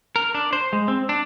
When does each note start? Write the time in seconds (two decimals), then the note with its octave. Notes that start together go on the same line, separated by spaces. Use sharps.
0.16 A#4
0.35 D4
0.53 C5
0.73 G#3
0.88 C4
1.09 D4